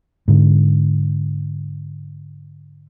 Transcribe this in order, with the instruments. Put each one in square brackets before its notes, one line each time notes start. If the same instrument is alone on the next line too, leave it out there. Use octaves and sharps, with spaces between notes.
[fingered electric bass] G#2 D3